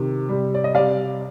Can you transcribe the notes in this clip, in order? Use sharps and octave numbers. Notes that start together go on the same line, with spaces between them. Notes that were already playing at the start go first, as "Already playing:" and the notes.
Already playing: C3 D#3
C3 G3
D5
D#5
C3 G3 D5 F5